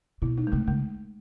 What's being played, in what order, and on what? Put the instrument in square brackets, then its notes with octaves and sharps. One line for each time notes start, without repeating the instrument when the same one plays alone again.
[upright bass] B2 [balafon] E4
[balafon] D#4
G#3
[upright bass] C3 [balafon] A3
[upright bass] C#3 [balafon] G#3